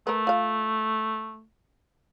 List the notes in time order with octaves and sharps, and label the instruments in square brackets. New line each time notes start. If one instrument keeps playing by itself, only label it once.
[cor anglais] A3 [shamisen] A#4 B4
[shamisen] F4 F5